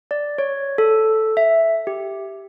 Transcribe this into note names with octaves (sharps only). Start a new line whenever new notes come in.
D5
C#5
A4
E5
G4